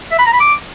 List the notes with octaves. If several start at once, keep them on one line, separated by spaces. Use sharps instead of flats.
E5
B5
A#5
B5
D6